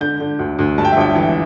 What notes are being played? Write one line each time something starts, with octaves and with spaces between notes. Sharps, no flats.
D3 G6
D3
D2
D2
G2 A5
G5
E5
G1 G5
E3